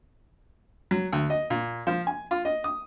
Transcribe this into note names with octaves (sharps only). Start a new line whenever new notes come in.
F#3
D2
D#5
A#2
F3
G#5
F4
D#5
D#6